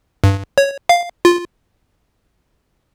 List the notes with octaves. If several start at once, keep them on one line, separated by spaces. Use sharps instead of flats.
G2
C#5
F5
F4